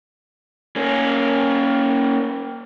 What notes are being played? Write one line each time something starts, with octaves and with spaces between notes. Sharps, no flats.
A#3 C#4